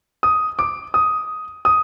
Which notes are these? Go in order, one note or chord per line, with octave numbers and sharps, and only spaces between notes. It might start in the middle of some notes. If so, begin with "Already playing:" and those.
D#6
D6
D#6
D#6